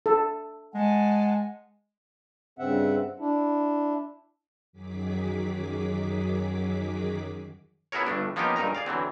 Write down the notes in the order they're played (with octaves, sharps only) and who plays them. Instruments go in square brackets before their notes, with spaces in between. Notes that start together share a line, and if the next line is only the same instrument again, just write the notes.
[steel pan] A4
[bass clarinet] G#3 [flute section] F#5 G#5 A5
[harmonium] G2 C#3 C4 E5 F#5
D4 E4
[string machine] F#2 D#3 F#3 G#4 D6 B6
[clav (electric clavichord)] B3 E4 F#4 G#4 A#4 C#5
G1 G2 A3 D4
F3 A#3 B3 C#4 D#4 G4
G2 A#2 D#4 A#4 A#5
G#4 D5 F5
D3 E3 F#3 C4